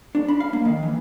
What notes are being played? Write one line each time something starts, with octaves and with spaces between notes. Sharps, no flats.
D4
B5
F5
A#3
D#3
E3